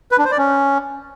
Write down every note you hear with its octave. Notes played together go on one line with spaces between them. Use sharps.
B4
D4
C5
D5
C#4